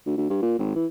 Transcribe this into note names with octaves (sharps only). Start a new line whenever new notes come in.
D2
D2
G2
A#2
G#1
E3